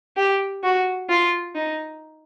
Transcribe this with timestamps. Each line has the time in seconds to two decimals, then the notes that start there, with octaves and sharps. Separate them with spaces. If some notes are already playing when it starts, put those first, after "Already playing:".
0.17 G4
0.63 F#4
1.09 F4
1.55 D#4